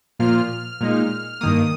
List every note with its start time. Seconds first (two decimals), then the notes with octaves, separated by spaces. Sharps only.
0.20 A#2 F3 A#3 F4 F6
0.81 A#2 G#3 D#4
1.41 G2 D#3 A#3 D#6